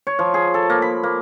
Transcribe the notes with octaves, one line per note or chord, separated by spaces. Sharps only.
C#5
F3
G#4
A4
A#3
B5
A#3